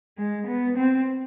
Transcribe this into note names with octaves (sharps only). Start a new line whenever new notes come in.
G#3
B3
C4